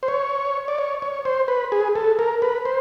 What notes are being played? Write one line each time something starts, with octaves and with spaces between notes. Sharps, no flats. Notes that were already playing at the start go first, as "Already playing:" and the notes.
C5
C#5
D5
C#5
C#5
C5
B4
G#4
A4
A#4
B4
C5